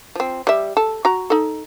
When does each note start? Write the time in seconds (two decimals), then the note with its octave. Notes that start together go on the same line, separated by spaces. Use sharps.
0.15 F3 C4
0.47 G3 E5
0.77 A4
1.05 F#4 A#5
1.30 D#4 A4